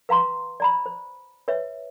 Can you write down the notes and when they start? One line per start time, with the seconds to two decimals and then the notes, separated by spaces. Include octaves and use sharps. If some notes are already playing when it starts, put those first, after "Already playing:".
0.09 B4 F5 A#5 C6
0.60 D5 A#5 B5
0.86 C5
1.48 B4 C#5 E5